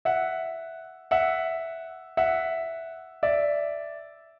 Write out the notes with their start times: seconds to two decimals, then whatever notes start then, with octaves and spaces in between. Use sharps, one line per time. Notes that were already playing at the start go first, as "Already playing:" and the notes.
0.05 E5 F#5
1.11 E5 F#5
2.17 E5 F#5
3.23 D5 E5